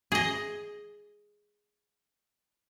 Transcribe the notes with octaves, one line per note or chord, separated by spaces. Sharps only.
G#4 D#5